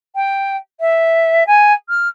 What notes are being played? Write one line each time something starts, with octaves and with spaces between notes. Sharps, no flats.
G5
E5
G#5
F6